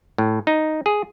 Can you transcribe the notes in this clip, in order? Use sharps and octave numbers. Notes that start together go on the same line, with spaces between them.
A2
D#4
G#4